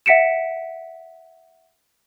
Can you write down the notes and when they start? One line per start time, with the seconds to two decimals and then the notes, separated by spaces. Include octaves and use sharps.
0.06 E5 F#5 B6 C#7 D7 E7